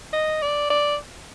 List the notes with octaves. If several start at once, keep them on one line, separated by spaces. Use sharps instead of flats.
D#5
D5
D5